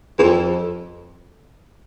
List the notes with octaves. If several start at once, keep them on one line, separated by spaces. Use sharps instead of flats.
E2
F2